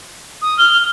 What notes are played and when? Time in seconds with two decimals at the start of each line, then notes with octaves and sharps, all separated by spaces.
0.42 D#6
0.58 F6 G7